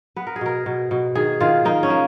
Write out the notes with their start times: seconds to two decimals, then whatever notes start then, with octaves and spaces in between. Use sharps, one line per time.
0.16 B3 B4
0.27 A#4
0.36 G#4
0.41 B2 A#4
0.66 B2
0.91 B2
1.15 D#3 G#4
1.40 D#3 F4
1.65 A#3 D#4
1.83 C#4
1.90 A#3